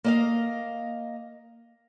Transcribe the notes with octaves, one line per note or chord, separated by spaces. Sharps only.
A#3 D#5 F5